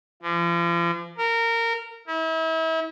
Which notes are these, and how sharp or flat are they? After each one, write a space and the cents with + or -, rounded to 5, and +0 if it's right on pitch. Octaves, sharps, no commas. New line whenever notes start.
F3 -40
A#4 -20
E4 -35